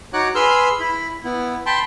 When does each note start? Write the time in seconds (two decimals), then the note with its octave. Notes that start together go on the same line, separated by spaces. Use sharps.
0.13 D#4 F#4 C#5 F#5 D6 F#6
0.35 G#4 B4 C6 E6 F6
0.80 E4 B5
1.24 B3 E4
1.66 G5 A5 B5 C6